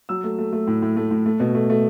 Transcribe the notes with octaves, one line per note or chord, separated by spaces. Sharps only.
F#3 E6
A3
A3
A3
A2
A2
A3
A2
A3
B2
A3
A3